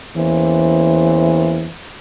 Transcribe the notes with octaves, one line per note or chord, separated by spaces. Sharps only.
E2 E3 A#3 C#4 C5